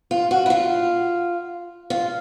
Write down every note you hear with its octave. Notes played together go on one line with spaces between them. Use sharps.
F4
F#4
E4
F4
F4